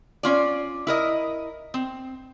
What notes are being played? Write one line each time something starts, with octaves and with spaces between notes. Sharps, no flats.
C#4 F4 D5
E4 A#4 D#5
C4